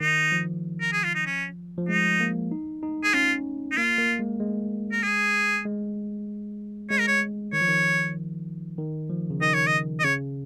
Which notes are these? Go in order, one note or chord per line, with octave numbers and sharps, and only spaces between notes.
D#3 D#4
F3
A#4
G#4
F4
D#4
C#4
F3
G#3 D#4
A#3
D#4
D#4
G#4
C#4 F4
D#4
A#3 F4
A#3
G#3
G#3
A#4
G#4
G#3
G#3 C#5
A#4
C#5
D#3 C#5
F3
D#3
D#3
F3
C#3
D#3 D#5
C#5
D#5
D#5
C#3 C#5